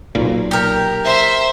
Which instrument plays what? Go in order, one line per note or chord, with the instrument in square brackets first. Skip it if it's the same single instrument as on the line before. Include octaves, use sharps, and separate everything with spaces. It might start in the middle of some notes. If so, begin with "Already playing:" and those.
[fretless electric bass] B1 A#2
[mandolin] G4 A#4
[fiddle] C5 [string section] E5